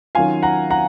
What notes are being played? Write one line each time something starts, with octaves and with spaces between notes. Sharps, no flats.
D#3 F#3 C#4 F4 F5 G#5
F#5 A#5
F#5 A#5